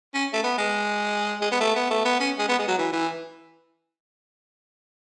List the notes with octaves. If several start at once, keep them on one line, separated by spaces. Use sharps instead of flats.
C#4
A3
B3
G#3
G#3
B3
A3
B3
A3
B3
C#4
G#3
B3
G#3
F#3
E3
E3